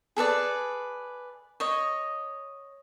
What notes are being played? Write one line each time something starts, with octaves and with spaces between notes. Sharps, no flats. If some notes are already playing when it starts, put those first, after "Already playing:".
G#4 A4 B4 D5
C#5 D#5